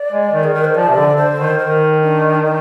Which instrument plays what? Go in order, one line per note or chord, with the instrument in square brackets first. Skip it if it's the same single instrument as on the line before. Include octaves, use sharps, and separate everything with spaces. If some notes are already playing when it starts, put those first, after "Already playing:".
Already playing: [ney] D5
[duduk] G#3
D#3
[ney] G#4
[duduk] D#3 [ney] A#4
[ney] C5
[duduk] F3 [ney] D5
[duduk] C3
D3
[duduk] D3 [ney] C5
[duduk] D#3
[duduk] D#3 [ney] A#4
[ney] D4
D#4